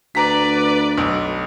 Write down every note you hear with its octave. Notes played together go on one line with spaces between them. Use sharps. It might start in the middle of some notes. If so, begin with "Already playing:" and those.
D2 B4 D5 A#5 B6
B1